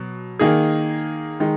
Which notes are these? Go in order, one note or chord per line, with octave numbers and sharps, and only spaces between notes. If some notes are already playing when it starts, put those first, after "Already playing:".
Already playing: B2 F#3
D#3 A#3 D#4 G#4
D#3 G#3 D#4